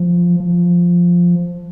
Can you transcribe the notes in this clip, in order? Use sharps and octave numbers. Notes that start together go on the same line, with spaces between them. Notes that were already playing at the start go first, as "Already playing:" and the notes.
Already playing: F3
F3